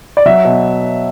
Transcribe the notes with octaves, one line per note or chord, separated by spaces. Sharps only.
D5
F#3 E5
B2